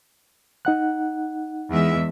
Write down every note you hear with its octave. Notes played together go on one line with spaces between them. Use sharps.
D#4 F#5 F#6
E2 G#3 E5